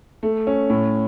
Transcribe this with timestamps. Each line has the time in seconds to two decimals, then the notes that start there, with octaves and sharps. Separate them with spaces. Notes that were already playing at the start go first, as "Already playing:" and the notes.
0.23 A3
0.47 C#4
0.70 A2